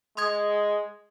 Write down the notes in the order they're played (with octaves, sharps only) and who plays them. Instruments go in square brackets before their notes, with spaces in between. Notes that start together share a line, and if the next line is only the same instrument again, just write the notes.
[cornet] G#3 [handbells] C6 D#6 G#6